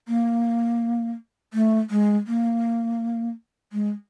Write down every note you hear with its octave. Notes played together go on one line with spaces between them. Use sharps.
A#3
A3
G#3
A#3
G#3